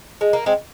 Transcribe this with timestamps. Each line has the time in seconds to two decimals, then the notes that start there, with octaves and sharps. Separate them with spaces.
0.21 G#3
0.33 A#3
0.46 G#3 C4